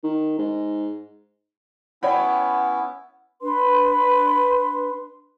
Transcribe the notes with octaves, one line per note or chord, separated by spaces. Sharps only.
D#3
G#2
B3 C#4 E4 C#5 F#5 G5 B5
D4 B4 C6